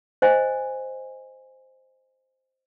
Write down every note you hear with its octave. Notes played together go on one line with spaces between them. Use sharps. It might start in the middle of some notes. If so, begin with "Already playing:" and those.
C5 D#5 G#5